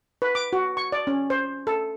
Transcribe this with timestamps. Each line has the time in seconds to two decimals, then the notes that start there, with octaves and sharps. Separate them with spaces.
0.22 B4
0.35 D6
0.53 F#4
0.77 C#6
0.92 D5
1.07 C#4
1.30 C5
1.67 A4